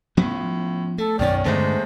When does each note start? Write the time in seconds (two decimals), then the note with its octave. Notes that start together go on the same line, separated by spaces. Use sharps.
0.17 A2 F3 B3 C#4
0.98 A3 A4
1.19 B1 F#2 D#3 B3 C#4 D5
1.45 E2 G2 D3 G#3 A3 C#4 C5